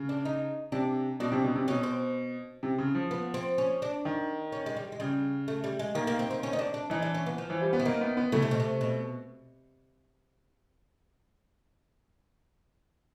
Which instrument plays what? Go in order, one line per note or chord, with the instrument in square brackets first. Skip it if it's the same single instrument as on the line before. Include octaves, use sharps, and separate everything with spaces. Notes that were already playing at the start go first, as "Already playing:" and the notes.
Already playing: [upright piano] C#3
[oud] D4
D#4
[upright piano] C3 [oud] D4
[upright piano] B2 [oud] D4
[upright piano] C3
B2
C3
[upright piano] B2 [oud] C#4
[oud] C4
[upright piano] C3
C#3
F3
[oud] B3
C4
C#4
D4
[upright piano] D#3
[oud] C#4
G#3
G3
G#3
[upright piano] C#3 [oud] G3
[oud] A3
G3
G#3
[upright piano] D#3 [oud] A#3
[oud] A#3
C4
C4
C#4
D#4
D4
D4
[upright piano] E3 [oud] D#4
[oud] D4
C#4
B3
F3
[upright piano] E3
G3
B3
[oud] E3
[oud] D#3 [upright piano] A#3
[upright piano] B3
B3
[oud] C#3 [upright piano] A3
[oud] C3
B2
C3
B2